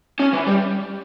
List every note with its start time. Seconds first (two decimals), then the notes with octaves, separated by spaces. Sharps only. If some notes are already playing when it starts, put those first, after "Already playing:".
0.19 C#4
0.33 E3
0.47 G3